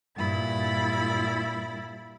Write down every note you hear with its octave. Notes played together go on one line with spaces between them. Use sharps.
G2 A#2 E4 B5 A6